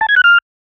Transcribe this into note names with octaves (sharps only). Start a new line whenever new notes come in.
A5
G#6
F#6
F6